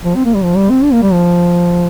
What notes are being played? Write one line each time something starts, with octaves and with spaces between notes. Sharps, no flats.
F3
C4
A#3
G3
F3
G3
C4
D4
A#3
G3
F3